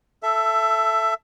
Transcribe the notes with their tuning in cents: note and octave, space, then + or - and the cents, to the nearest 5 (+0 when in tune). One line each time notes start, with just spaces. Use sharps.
A4 +0 E5 +15